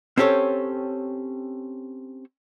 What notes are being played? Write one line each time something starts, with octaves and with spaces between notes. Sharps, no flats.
C4 C#4 G4 A4 C#5